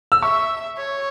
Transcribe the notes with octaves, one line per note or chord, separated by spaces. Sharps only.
E6
E5 C#6
C#5